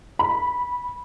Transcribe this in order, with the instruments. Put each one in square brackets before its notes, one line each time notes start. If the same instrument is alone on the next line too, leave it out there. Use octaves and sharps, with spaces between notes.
[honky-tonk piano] B5